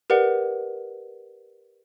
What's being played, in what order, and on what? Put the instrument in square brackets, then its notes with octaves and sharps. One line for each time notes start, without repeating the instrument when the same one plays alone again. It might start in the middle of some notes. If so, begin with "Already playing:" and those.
[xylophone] G4 A#4 B4 D5 F#5